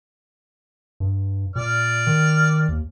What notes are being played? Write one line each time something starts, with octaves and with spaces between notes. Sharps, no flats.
G2
A#2 D5 F6
D#3
D#2